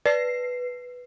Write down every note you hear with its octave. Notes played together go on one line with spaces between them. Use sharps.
B4 D5 C7